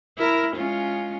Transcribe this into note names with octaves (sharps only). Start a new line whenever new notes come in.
E4 A#4
G#3 C#4 F4